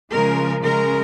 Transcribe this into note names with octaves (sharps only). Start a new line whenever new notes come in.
C#3 F3 G#3 A#4
C#3 G#3 A#4